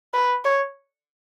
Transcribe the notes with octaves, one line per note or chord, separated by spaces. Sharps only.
B4
C#5